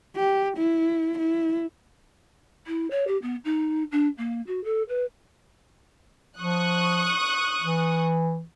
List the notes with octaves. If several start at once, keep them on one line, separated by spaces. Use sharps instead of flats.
G4
E4
E4
E4
C#5
G4
B3
D#4
D4
A#3
F#4
A4
B4
F3 C#6 D#6 F#6
E3